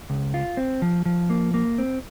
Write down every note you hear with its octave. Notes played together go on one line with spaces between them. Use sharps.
C#2
F4
C4
F3
F3
A#3
A#3
C4